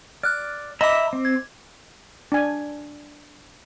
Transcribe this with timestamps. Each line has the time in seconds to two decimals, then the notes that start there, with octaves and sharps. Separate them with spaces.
0.23 D5 F6 F#6
0.81 D#5 E5 A#5 B5 D6
1.13 C4
1.25 G#6
2.32 D4 G#5